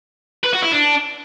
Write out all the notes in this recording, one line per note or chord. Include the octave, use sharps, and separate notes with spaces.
B4
F#4
E4
D4